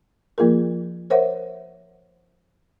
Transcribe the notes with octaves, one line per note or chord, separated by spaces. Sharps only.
F3 A#3 F4 G#4 A#4
A#4 C5 C#5 E5 F#5